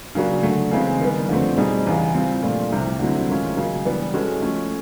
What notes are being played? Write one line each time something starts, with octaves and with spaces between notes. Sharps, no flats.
C#3 F#3 A#3 D4 F#4
D3 F#3 A3
C#3 E3 G#3 C4
D#3 G3 B3
F2 D3 F3 A3 C4
B2 G3 C4 D#4 G#4
E2 C#3 E3
G3 C4 F4
A#2 F3 A3 D4 F4
C2 C3 F3
D3 F#3 A3 C4 E4
G#2 D#3 G#3 C#4 F4
C#3 F#3 A#3
E3 G3 B3 D4 G4
G#3 C#4 F#4 A4
F3 A3 C#4